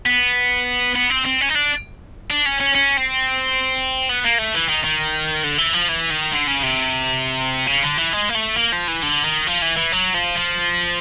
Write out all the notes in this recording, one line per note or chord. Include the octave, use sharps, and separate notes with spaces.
B3
B3
C4
C4
C#4
D#4
D4
D4
C#4
C#4
C#4
C4
B3
A#3
A3
E3
D#3
D#3
D3
E3
F3
E3
D#3
D3
C#3
C3
C#3
D3
E3
G#3
A#3
A3
A#3
F3
E3
D3
D#3
F3
E3
E3
F#3
F3
F3